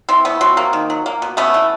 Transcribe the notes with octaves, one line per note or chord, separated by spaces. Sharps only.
E3 C4
A3 B3
F#3 C4
A#3
D#3
F#3
A#3
B2
A3 B3 C#4
E3